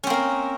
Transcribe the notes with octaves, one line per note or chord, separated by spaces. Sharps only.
A#3 C4 C#4 A#4